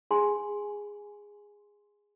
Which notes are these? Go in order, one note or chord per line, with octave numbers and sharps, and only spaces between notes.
G#4 G#5 C6